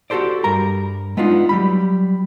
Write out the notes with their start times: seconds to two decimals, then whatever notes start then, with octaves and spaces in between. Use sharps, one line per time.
0.10 F#4 G4 A4 C5 D5
0.44 G2 G3 A#4 A#5
1.17 G#3 B3 D4 D#4 F4
1.49 F#3 G3 B5